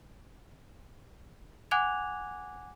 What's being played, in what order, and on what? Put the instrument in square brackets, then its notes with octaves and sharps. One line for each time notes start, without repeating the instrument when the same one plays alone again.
[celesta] F#5 G#5 D6 F#6 G#6 F7